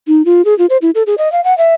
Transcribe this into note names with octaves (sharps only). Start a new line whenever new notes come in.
D#4
F4
G#4
F4
C5
E4
A4
G#4
D#5
F5
F#5
E5